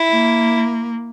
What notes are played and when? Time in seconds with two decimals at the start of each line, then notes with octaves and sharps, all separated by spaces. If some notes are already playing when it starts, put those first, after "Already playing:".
Already playing: E4
0.11 A#3